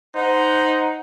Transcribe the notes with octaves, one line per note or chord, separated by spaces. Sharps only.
D#4 C5 F#5